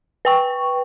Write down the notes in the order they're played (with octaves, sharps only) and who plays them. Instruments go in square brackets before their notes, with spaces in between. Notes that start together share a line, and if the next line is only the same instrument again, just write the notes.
[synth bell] B4 G5 C#6